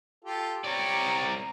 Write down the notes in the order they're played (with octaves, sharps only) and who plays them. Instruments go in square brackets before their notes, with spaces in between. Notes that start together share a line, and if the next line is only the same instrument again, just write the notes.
[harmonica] F4 G4 A4
[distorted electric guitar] C2 D5 [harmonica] G3 C#5 [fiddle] A#5